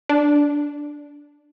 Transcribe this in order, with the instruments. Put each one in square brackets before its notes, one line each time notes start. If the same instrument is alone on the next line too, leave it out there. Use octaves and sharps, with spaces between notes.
[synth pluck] D4